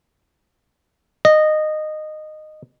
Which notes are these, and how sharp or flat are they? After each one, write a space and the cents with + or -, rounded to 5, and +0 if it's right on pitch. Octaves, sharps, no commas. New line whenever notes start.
D#5 -15